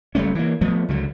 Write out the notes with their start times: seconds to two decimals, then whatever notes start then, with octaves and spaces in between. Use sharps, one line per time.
0.15 F#1 G3 A3 C#4
0.35 E3 A#3
0.61 F3 A3 B3
0.89 C#2 D3 F#3